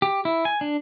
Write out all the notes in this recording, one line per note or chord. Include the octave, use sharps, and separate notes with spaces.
G4
E4
G#5
D4